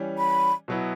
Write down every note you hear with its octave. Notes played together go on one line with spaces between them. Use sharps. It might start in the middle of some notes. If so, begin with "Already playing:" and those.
Already playing: E3 G3 C#4
B5
B2 F#3 B3 E4